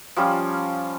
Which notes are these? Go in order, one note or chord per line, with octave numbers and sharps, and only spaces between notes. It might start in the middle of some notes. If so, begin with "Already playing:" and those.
F3 G3 C#4 F4